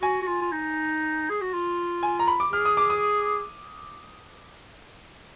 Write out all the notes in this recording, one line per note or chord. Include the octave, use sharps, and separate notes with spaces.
F#4 G#5
F#4
F4
F4
D#4
G#4
F#4
F4
G#5
A#5
B5
D6
G#4 F6
D#6
D6
D#6